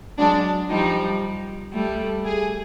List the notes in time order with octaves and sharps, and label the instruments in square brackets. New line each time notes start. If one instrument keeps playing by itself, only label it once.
[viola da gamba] F#3 G#3 [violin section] D4
[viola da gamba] F3 G3 [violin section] D#4
[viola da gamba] G3 A3
[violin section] G#4